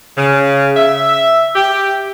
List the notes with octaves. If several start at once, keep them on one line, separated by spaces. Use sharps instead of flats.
C#3
E5
G4